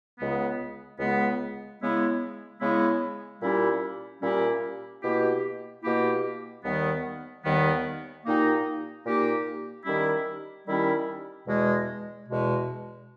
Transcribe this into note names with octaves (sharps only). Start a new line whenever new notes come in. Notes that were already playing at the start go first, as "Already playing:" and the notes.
C#2 C#3 G#3 B3
C#2 C#3 G#3 B3
C#3 G#3 B3 E4
C#3 G#3 B3 E4
A#2 G3 C#4 E4 G4
A#2 G3 C#4 E4 G4
B2 A#3 E4 G4
B2 A#3 E4 G4
D#2 D#3 G3 B3
D#2 D#3 G3 B3
A#2 A#3 D#4 G4
A#2 A#3 D#4 G4
D#3 G3 C#4 E4 G4
D#3 G3 C#4 E4 G4
E2 B2 G#3
E2 B2 G#3